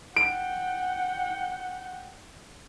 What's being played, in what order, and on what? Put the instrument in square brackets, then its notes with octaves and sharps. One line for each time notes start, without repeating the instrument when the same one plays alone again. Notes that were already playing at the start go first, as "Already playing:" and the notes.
[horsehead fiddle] F#5 G5 [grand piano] D7